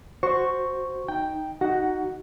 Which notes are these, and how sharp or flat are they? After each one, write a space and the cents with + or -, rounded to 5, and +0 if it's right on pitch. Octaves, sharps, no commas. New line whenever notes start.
F#4 +0 C5 +0 C#6 +0
D#4 +0 G5 +0
D#4 +0 F#4 +15 F#5 +0